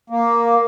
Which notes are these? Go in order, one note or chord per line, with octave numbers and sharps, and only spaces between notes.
A#3